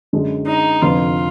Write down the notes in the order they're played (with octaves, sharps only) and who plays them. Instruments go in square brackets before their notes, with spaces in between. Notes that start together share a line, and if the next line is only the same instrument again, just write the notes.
[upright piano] F#2 D3 G#3 D4
[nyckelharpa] D#4
[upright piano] F1 F2 D3 F3 B3 [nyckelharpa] F4